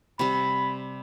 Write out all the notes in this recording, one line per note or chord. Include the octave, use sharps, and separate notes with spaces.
C3 G3 B5